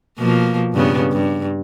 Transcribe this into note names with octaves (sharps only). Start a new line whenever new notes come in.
B2 F3 A#3
G2 C#3 B3
G2